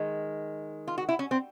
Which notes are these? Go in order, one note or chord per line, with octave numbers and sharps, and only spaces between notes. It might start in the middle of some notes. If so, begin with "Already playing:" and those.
Already playing: D#3 G#3
F4
F#4
E4
C#4
C4